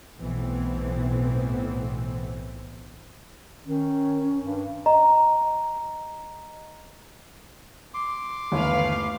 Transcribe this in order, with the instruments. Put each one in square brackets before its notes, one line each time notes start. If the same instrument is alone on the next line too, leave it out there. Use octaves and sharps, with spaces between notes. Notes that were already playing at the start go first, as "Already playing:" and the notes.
[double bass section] B1 A2 E3 B3 C4
[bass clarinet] D#3 [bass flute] C#4
[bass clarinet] G2
[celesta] D#5 A#5
[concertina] C6 D6
[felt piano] G1 D#2 E3 [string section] A3 B4 F5